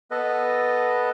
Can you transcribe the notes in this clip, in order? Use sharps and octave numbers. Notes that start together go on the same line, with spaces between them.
B3 A4 B4 D#5